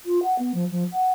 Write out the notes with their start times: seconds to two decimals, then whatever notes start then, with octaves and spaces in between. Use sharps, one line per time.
0.06 F4
0.23 F#5
0.39 B3
0.54 F3
0.71 F3
0.92 F#5